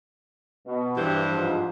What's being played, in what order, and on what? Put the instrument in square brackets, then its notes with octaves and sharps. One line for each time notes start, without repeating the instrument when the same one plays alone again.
[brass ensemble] B2
[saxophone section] G2 E3 C5 [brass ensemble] D4 G4
[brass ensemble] G#2 F3